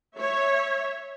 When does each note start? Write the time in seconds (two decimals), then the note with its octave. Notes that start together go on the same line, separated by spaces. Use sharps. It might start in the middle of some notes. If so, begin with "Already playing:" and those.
0.15 C#5 E5